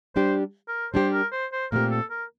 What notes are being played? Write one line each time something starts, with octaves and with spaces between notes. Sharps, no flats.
G3 D4 G4 C5
A#4
G3 D4 G4 C5
A#4
C5
C5
A#2 A3 C4 G4 A#4
A4
A#4